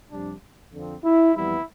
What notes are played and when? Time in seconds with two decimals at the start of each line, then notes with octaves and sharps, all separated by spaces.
0.10 F2 C3 G3 D4
0.72 F2 D3 F3 C4
1.03 E4
1.34 F2 E3 G3 B3 E4